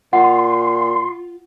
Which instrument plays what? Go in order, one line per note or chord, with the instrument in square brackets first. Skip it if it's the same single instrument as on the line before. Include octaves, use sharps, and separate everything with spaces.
[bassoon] A#2 [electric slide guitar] F4 [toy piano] F#5 [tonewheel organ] C6